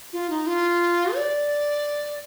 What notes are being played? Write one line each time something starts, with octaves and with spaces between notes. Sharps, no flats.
F4
D#4
F4
D5